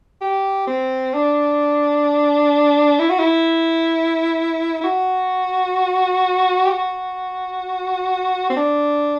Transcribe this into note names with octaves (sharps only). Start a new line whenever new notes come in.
G4
C4
D4
E4
F#4
E4
E4
F#4
G4
F#4
C4
D4